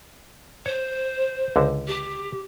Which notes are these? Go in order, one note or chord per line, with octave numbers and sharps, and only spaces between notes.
C5 C#5
C#2 D3
G4